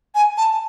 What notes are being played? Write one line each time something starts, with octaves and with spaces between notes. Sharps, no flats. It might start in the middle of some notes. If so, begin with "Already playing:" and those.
G#5
A5